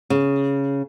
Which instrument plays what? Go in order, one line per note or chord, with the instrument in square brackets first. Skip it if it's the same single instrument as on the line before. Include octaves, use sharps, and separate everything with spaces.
[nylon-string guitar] C#3